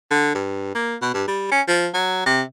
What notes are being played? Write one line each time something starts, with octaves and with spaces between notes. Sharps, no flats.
D3
G2
A#3
B2
G2
G3
C#4
F3
F#3
C3